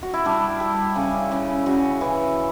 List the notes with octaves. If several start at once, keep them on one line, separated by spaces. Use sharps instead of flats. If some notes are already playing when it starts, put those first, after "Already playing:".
F#4
E4
G3 D4
G3
C#3
C#3
C#3 F#4
E3